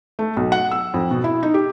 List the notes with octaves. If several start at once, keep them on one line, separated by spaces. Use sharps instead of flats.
A3
B1
F#5
E6
F2
B2
E4
D#4
G4